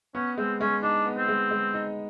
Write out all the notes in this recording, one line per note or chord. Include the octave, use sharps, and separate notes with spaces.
B3 C#4
G#3 C4
G#3 C#4
D4 D#4
B3
C4
G#3
G#3
D#4